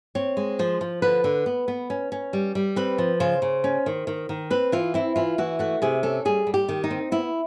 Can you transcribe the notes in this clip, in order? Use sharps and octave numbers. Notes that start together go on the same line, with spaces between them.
C4 C#5
G#3
F3 C5
F3
D3 B4
D3
B3
B3
C#4
C#4
G3
G3
C4 B4
F3
C#3 C5
C#3
C#4
D#3
D#3
D#3
C4 B4
E3 F4
C4 E4
E3 F4
E3 F#4
A3 F#4
C3 G#4
C#4 A4
G3 G#4
G3
G4
D#3
D#4
C4
B3 E4